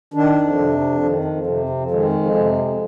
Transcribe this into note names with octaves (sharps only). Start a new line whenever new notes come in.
D#3 D4
F2
C3
F2
D#3
F2
C3
F2
D#3 G#3
F2
C3
F2